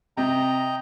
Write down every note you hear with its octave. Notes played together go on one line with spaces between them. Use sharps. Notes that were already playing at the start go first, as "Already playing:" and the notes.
C3 D#5 G5 A#5